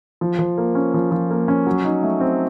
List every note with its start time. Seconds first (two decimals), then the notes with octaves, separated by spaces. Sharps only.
0.21 F3
0.39 F3
0.58 A#3
0.75 C#4
0.94 F3
1.11 F3
1.31 A#3
1.48 C#4
1.67 F#3
1.85 D#4
2.03 A3
2.20 C4